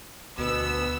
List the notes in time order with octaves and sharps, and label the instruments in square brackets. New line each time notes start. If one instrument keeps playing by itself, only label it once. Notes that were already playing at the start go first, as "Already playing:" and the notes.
[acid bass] D2 [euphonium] B2 [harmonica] B3 [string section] E6